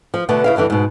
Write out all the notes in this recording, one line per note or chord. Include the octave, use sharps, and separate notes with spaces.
F3
B2 D3 A3 B3
C#3 E4 F5
E2 G2 D3 E3
G#2 B2